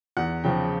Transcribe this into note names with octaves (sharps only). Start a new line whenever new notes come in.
E2 F#5
C#3 F3 G5